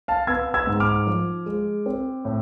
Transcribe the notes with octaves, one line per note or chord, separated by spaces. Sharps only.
F5 A5
B3 E6 G#6
E6 G#6
G#2
D6 F6
F3
G#3
C4
A2